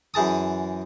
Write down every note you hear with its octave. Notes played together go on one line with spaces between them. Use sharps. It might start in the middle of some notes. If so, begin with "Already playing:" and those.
F#2 E3 G#4 A5 D#6